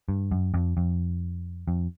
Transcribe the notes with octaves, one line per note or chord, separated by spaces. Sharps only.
G2
F#2
F2
F2
F2